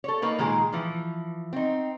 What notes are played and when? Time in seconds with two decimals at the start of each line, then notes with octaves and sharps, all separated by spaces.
0.04 A4 C#5
0.22 A#3 D#4 B4
0.39 A#2 D#3 G#3 G#4
0.72 E3 F3
1.53 C4 D#4